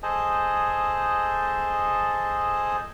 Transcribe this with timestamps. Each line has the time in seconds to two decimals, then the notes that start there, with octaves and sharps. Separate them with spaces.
0.03 G#4 A4 C5 D#5 A5